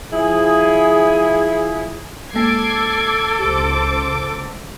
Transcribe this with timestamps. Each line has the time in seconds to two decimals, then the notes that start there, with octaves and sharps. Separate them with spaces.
0.12 F3 E4 G#4
2.34 G#3 A#3 A4 D6 G#6 C7
3.39 C#2 G4 C5 D6